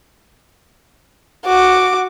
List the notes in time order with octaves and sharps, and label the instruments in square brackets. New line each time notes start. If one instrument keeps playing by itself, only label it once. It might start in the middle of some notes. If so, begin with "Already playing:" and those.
[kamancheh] F#4 D6